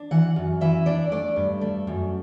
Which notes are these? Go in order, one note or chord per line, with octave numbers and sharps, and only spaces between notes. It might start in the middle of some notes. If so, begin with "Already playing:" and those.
Already playing: D4
E3 F#5
F#2
E3 E5
D4 D5
A3 D5
G2
A3
F#2